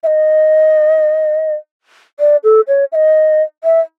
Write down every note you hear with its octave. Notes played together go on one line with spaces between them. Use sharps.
E5
D#5
D5
A4
C#5
E5
D#5
E5